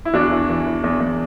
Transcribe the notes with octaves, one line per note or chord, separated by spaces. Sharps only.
E4
E2 D4 F#4
E3
E3
E3
E2
E2